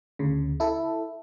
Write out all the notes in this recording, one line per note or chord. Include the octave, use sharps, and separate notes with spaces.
D2 C#3
E4 A4